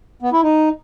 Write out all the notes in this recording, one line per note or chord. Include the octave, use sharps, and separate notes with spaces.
B3
E4
D#4